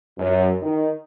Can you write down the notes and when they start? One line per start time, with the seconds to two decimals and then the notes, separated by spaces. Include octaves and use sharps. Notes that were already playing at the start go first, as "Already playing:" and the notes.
0.18 F#2
0.61 D#3